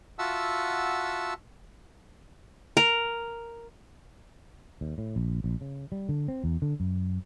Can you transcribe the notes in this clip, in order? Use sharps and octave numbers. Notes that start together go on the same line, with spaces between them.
F4 F#4 E5 F#5 A5 E6
A#4
D#2
A2
A#1
A#1
C#3
G3
D3
C4
E2
D3
F#2